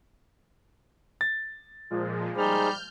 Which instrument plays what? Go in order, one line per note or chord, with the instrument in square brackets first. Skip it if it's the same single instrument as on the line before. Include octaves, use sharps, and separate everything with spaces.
[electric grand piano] A6
[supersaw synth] A#2 F3 G#3
[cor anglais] G3 [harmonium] D#4 G#4 C5 [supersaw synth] F6 G6